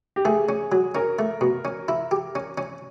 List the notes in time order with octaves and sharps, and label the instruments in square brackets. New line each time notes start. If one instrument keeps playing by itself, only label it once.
[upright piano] G4
[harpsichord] A3 [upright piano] G#4
[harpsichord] C#4
F#3
[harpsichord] C#4 [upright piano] A#4
[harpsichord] A3
B2
C#4
E4
G4
C#4
C#4